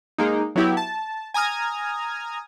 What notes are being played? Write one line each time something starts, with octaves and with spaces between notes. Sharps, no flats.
G#3 A#3 D#4
F#3 B3 E4 G4
A5
G#5 A#5 D#6 F6 G#6